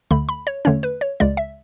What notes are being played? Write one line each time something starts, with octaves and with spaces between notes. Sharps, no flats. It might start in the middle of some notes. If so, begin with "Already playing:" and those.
D2 D3 A3 B5
B5
C#5
E2 D3 A3 C#4 C#5
B4
C#5
C#2 C#3 G#3 D5
E5